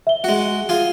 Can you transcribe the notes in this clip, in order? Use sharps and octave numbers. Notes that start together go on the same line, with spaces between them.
E5 G7
G#3 F#4 F#5
F4 G#4